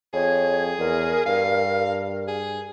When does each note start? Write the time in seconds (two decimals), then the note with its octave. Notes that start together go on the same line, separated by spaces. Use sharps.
0.14 F2 G#4 C#5
0.79 E2 A#4
1.26 G2 F5
2.28 G#4